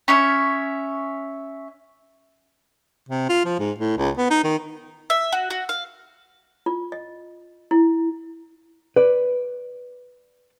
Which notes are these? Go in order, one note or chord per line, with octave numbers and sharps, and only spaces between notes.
C#4 C#5 E5
C3
F4
F3
G#2
A2
C#2
B3
D#4
D#3
E5
F#4
F#4
F5
F4
D#5
E4
B4 D5